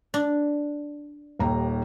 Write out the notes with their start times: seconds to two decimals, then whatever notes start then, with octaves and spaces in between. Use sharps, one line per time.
0.14 D4
1.39 D#1 D#2 A#5